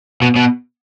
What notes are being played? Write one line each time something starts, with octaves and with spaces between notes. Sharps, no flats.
B2
B2